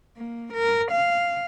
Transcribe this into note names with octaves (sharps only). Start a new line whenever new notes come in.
A#3
A#4
F5